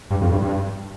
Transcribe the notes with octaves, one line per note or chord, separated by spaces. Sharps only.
G2
F2
G2
G2